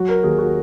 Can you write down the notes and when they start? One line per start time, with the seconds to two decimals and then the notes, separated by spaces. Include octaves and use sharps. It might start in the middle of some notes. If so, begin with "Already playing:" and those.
Already playing: F#3 F#4
0.09 A#4
0.23 D#2 G#4
0.38 F#4